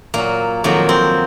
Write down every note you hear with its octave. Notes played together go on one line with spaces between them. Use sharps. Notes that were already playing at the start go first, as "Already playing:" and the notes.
A#2 F#3 A#3
F2 D#3 F#3 A#3
C4